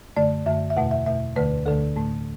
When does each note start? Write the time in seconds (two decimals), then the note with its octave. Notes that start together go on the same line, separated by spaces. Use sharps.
0.17 F#2 D3 A3 D5
0.46 F#2 D3 A3 E5
0.70 E5
0.76 E2 B2 A3 F#5
0.91 E5
1.06 E2 B2 A3 E5
1.36 D2 D3 A3 B4
1.66 D2 D3 A3 A4
1.96 A2 A3